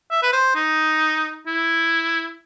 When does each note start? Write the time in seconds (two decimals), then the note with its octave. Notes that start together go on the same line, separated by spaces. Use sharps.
0.11 E5
0.23 B4
0.33 C5
0.55 D#4
1.47 E4